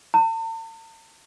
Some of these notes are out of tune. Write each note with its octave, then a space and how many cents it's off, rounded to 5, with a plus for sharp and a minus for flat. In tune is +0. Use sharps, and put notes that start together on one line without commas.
A5 +45